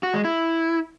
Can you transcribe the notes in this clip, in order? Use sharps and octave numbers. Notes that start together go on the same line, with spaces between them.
F#4
G#3
E4